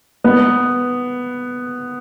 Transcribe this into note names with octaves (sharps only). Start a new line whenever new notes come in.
B3